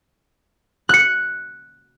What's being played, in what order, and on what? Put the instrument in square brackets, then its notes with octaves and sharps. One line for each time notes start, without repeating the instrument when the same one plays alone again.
[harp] F#6 C#7